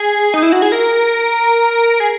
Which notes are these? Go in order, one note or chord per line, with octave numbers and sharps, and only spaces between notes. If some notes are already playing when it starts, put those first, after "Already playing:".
Already playing: G#4
D#4
E4
F#4
G#4
A#4
G#4